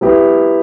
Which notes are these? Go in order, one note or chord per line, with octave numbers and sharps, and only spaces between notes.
F#3 B3 E4 G4